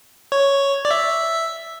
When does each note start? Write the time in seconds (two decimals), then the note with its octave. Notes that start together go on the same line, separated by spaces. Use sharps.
0.32 C#5
0.85 D5
0.91 E5